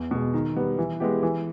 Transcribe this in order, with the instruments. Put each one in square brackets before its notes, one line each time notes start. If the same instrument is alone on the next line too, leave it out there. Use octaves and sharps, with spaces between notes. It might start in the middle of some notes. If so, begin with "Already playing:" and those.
Already playing: [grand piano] E2
B2 G#3
D#3
G3 B3
E3
G#3 B3 E4 G4
E3